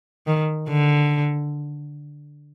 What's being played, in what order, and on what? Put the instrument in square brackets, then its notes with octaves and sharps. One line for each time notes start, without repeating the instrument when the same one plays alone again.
[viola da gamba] D#3
D3